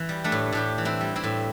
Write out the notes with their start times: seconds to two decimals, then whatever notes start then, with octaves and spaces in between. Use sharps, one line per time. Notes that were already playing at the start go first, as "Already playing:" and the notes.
Already playing: E3
0.09 G3
0.24 A3 D4
0.32 A2
0.53 A2 D4 G4
0.78 E3
0.85 C4 E4
1.01 G3
1.16 C4 E4
1.24 A2